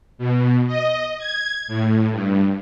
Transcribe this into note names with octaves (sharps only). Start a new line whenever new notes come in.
B2
D#5
G#6
A2
G2